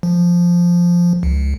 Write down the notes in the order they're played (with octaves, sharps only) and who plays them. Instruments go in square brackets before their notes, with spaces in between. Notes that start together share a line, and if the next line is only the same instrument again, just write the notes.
[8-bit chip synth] F3
C#2